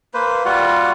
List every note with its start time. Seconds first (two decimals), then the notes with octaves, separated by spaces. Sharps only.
0.14 A#3 B4 C5
0.45 G3 F4 F#4 F#5